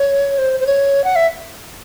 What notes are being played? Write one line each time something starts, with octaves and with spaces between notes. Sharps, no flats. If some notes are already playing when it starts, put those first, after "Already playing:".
Already playing: C#5
C5
C5
C#5
F#5
E5